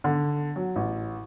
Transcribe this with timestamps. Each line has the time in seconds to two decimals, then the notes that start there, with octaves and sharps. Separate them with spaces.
0.04 D3
0.56 F#3
0.76 A1